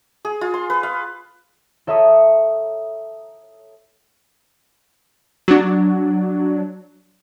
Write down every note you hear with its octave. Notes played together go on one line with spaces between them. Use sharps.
G#4
F4
C6
B4
F5
A4 C#5 E5 A#5 C#6 D#6
F#3 D4